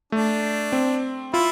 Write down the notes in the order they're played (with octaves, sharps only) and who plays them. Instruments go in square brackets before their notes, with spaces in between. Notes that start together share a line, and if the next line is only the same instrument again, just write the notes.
[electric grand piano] A3 [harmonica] D4
[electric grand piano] C4
[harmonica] E4 [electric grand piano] F4